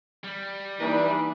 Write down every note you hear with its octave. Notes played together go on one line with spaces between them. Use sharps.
G3
E3 A#3 D4 D#4 B4 D5